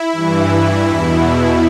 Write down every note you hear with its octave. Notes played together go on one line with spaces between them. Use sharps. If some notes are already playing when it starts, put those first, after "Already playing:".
Already playing: E4
G2 E3
E2 B2